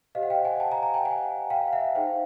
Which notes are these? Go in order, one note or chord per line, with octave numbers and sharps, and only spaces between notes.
G4 C5 D#5 F5
F#5
F5 G5
F#5 G#5
G5 A5
G#5 A#5
G#5 A#5
G5 A5
F#5 G#5
F5 G5
F5
E5 F#5
D#4 G#4 C5 F5 G5